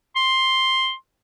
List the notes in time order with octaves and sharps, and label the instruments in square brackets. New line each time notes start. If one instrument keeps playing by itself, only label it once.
[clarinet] C6